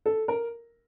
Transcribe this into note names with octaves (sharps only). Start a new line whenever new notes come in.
A4
A#4